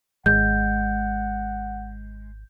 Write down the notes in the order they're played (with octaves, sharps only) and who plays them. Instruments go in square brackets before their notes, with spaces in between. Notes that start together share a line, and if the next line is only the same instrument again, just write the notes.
[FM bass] G#1 [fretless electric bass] G#3 [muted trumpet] F#5 [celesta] G6